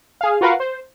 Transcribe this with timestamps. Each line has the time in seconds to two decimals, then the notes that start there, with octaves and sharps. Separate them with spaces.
0.21 G#4 F5
0.41 F4 F#4 A#4 B4 F5 F#5
0.60 C5